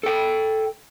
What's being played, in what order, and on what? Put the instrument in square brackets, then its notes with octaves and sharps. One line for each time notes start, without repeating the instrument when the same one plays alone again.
[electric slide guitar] A4 G5